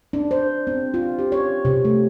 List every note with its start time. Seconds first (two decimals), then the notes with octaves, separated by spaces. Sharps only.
0.13 D4
0.31 C5
0.67 C4
0.94 F4
1.19 G4
1.32 C#5
1.65 C3
1.85 A3